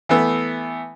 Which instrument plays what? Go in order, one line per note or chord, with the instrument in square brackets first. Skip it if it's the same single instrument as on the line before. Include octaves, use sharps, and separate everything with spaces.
[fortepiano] E3 A3 B3 E6